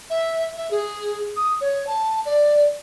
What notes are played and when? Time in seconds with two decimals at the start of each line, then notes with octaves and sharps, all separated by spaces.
0.10 E5
0.57 E5
0.71 G#4
1.36 D#6
1.61 C#5
1.87 A5
2.26 D5